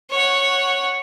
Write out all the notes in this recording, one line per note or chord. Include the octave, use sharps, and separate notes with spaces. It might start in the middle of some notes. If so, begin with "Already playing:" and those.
C#5 F#5